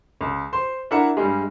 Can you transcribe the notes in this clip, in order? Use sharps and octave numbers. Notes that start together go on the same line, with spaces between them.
C#2
C5 C6
D4 E4 A#4 E5 F#5 A#5
G2 G3 G#3